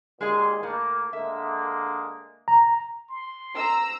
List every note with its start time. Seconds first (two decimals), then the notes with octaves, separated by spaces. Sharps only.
0.21 D#2 A#2 G#3 G#4 D#5
0.63 A2 A#3
1.13 D3 G#3 A#3 E5
2.48 A#5
3.10 C6
3.56 A#5 E6